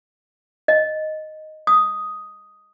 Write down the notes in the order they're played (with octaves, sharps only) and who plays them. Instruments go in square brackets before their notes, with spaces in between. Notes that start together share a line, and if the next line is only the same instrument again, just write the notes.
[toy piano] D#5
D#6